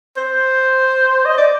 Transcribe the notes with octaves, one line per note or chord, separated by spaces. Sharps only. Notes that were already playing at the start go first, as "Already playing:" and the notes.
C5
D#5
D5